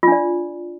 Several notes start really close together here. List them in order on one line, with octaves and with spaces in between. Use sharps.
F4 D4 D5